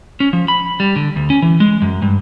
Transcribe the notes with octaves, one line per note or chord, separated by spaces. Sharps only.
C#4
F3
B5
G3
D3
D2
C#4
E3
G#3
F#2
G2